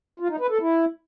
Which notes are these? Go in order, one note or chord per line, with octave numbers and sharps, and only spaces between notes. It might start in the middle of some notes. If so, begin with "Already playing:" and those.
F4
D#4
B4
A4
E4